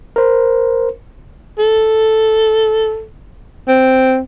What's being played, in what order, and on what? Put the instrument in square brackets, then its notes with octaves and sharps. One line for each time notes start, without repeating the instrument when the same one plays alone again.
[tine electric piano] A#4 C5
[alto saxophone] A4
C4